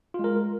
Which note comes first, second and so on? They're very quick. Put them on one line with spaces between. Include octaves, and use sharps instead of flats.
F4 G#3 A#4